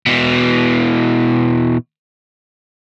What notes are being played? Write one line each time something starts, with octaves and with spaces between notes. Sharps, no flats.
B2 E3